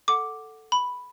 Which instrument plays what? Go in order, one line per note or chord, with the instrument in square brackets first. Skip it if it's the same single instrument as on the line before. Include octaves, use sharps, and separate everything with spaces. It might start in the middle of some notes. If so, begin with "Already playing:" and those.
[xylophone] A4 F#5 D6
B5